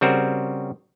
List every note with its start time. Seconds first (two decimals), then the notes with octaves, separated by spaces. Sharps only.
0.01 C#3 G3 C4 F#4 A#4 C5